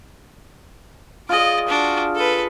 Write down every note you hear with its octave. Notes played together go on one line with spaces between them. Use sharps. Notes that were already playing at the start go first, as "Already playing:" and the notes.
F4 G#4 D5 D#5
D4 F#4
A4 B4